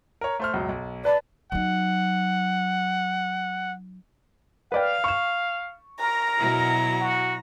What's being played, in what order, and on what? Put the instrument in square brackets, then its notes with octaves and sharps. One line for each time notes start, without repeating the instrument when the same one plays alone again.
[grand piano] A#4 C#5
A3 C5 F6
C#2 F#2 B2
B1
[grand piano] B4 A5 B5 [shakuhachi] D5
[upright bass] F#3 D#4 [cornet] F#5
[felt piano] B4 D5 G5 [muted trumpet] F5
[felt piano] C#6 E7
[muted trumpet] A#4 [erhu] A#5
[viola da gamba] B2 F#3 E4
[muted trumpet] F#4